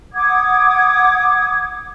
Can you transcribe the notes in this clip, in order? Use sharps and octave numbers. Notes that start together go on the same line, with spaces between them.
F#5 D6 D#6 G#6